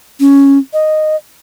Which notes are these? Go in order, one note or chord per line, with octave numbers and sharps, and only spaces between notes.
C#4
D#5